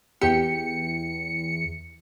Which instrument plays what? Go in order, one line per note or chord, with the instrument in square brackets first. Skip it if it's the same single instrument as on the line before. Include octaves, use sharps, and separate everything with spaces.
[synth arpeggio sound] E2 C#7 [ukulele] G4